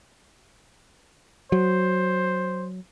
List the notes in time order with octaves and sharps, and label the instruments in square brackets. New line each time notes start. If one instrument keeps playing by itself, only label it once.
[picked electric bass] F#3 [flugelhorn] C5